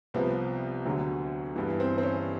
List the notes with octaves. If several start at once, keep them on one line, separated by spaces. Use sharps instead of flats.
C2 C3 F3 B3
D2 D3 F#3
G2 E3 B3
C4
C4
C#4